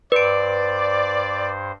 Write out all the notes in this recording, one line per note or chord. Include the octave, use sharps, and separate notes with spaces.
G2 B4 C5 D5 D7